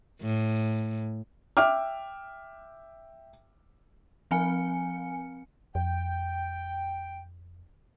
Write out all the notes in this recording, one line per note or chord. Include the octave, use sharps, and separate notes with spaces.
A2
E5 G5 D6 F6
F3 C4 G#5 C#7
F2 G5